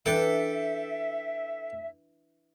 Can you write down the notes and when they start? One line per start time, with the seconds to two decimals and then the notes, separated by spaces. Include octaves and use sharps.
0.06 E3 D4 A4 E5 G5